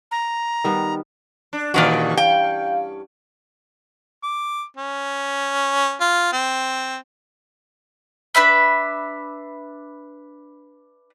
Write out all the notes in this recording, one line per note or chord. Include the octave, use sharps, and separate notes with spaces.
A#5
D#3 G3 B3
D4
G2 A#2 D#3 E3 C#4 F#4
F5 G5
D6
C#4
F4
C4
D4 B4 E5 B5